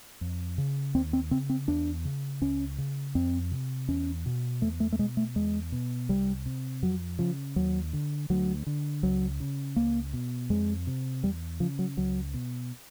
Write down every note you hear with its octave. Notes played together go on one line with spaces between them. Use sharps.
F2
C#3
D#2 C4
C4
C#3 C4
C4
E2 D4
C#3
C#2 C#4
C#3
F2 C4
C3
E2 C#4
B2
E2 A3
A3
A3
B2 G#3
A3
E2 G#3
B2
C2 G3
C3
F2 F#3
C#3 F3
D#2 F#3
D3
D2 F#3
D3
C#2 F#3
C#3
C#2 A#3
B2
F2 G#3
C3
E2 G3
C#3 F3
F#3
C#2 F#3
B2